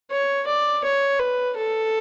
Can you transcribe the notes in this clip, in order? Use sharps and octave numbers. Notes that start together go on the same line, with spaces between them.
C#5
D5
C#5
B4
A4